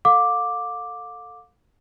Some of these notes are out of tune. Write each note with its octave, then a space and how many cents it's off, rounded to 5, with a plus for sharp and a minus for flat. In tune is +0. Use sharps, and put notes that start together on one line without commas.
A4 +5 F5 +35 D6 +0